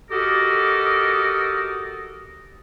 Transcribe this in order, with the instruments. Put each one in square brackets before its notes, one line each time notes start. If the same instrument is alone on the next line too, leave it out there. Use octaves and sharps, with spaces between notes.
[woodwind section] F#4 G4 A4 A#4 D#5